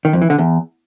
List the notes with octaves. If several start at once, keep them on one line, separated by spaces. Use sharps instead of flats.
D#3
F2
E3
D3
E2